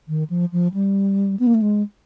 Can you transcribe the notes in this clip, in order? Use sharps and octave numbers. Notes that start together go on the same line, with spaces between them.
D#3
F3
F3
G3
B3
A#3
A3
G#3